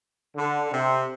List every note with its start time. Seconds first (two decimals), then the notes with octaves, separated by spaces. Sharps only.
0.36 D3
0.71 C3